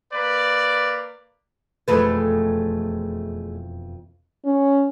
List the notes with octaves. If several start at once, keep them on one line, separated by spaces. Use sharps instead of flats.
A#3 B4 D5
E1 F2 G#3 A3 B4
C#4